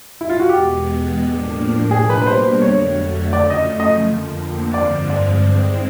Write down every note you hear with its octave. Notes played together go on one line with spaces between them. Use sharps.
E4
F4
F#4
E2 B2 G#3 B3 G4
A2 F3 A#3 D4
B2 G3 A#3 D4 G#4
B4
B4
C5
F2 D3 F#3 A3 C#5
F#2 C#3 F3 A3 D5
D#5
D#5
F2 D3 F3 A#3
G2 D3 F3 G#3 C4 D5
D5
D#3 G#3 C4 E4